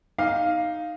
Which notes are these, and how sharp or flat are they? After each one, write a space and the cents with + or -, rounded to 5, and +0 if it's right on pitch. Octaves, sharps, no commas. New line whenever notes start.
D#4 +0 F5 +0